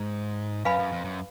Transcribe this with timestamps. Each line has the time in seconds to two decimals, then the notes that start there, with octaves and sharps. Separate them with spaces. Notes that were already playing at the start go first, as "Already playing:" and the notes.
Already playing: G#2
0.65 F#2 B4 F5 G#5 B5
0.79 F#2
0.92 F2
1.05 F#2